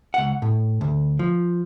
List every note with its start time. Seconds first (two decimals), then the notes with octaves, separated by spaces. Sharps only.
0.14 C#2 F#5
0.42 A2
0.81 D2
1.19 F3